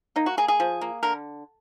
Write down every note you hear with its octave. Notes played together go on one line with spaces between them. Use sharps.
A#3 D#4
F#4
A#3 G#4
G#4
F3
A#3
D3 A#4